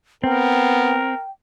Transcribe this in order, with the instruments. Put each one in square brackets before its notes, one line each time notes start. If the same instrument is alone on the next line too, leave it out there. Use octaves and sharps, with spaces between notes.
[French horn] B3 [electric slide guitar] C4 [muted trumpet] A#4 [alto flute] G5